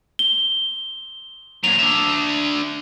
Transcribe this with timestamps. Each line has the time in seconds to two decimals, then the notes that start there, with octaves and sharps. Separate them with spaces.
0.19 G7
1.64 A#2 F#3 F7
1.79 D4 E5